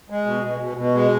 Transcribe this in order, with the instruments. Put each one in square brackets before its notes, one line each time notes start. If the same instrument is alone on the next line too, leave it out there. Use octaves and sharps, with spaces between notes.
[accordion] G#3
B2
B2
B2
B2
G#3